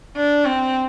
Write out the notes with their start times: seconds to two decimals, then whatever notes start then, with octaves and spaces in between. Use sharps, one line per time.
0.17 D4
0.46 C4